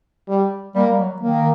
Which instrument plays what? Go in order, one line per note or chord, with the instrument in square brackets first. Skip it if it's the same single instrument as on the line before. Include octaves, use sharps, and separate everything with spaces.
[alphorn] G3
[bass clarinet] G3 [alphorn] A#3
[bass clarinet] G3
F#3
[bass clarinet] D#3 [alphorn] A#3